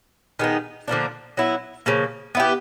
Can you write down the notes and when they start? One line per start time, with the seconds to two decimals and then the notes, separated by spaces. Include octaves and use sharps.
0.39 D#3 G#3 B3 D#4
0.88 D3 F3 A#3 D4
1.37 F#3 B3 E4
1.86 C#3 F3 A#3
2.35 B3 E4 G4